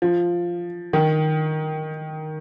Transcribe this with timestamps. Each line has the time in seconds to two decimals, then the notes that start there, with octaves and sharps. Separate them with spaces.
0.02 F3
0.93 D#3